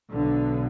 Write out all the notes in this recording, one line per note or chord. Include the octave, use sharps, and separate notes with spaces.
B1 B2 D3